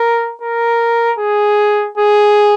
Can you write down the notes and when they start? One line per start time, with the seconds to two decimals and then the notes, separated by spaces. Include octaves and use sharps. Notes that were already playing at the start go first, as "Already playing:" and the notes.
Already playing: A#4
0.42 A#4
1.19 G#4
1.98 G#4